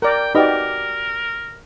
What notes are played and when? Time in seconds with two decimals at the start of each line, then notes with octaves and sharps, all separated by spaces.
0.02 A#4 D5 G5
0.35 D#4 F#4 G4 A#4 B4 D5 D#5